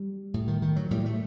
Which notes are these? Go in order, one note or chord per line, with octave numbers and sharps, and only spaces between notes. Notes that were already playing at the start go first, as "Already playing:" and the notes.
Already playing: G3
A2
D#3
D#3
F#3
A2 G3
A3